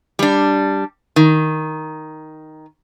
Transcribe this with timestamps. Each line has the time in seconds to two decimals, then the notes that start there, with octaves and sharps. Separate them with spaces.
0.19 G3 D4
1.16 D#3